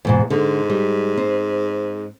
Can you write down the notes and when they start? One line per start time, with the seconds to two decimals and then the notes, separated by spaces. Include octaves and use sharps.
0.05 E2 G#2 B2
0.30 G#2 D3
0.70 G3
1.17 C4